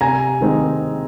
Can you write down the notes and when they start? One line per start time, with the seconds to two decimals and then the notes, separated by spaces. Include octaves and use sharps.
0.01 C3 G#5 A#5
0.41 D#3 G#3 C4 D#4